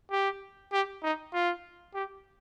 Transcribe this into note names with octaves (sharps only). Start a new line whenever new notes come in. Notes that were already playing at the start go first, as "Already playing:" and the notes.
G4
G4
D#4
F4
G4